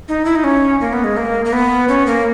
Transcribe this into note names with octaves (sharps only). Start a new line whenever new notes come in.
D#4
E4
D#4
C#4
A#3
B3
G#3
A#3
A#3
B3
C#4
A#3